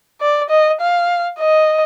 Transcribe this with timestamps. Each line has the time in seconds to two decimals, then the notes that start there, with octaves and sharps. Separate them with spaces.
0.21 D5
0.50 D#5
0.81 F5
1.40 D#5